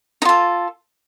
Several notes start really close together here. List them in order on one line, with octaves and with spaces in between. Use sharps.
D#4 F4 A4